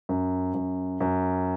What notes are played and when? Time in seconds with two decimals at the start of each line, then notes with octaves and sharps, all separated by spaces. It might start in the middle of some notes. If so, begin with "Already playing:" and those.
0.09 F#2
0.54 F#2
1.00 F#2